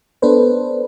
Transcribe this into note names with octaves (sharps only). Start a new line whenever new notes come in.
B3 D4 A4 B4 C5